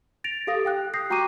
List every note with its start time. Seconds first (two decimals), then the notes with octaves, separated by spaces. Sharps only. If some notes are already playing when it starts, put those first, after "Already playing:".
0.24 A6 A#6 D7 F7
0.47 G4 A4 F5 D#6 A#6
0.65 F5 G5 F#6
0.94 D#6 G6 A#6 C7
1.10 F#4 G5 A#5 C#6 D6 D#7